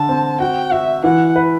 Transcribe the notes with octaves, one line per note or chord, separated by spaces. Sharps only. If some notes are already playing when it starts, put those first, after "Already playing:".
Already playing: D3 A5
C4
F#4 G5
F#4 E5
E3 F#5
B4